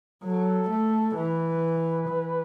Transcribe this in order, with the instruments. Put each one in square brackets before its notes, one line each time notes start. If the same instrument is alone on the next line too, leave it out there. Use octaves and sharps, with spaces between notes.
[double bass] F#3 [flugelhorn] A4
[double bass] A3
[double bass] E3 [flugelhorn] B4
[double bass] E3